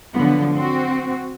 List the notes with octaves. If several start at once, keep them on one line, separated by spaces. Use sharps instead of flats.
D3 F3 F#3 B3
C4 F#4